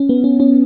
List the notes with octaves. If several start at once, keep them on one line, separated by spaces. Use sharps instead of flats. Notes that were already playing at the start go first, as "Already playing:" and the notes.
Already playing: C#4
B3
C#4
C#4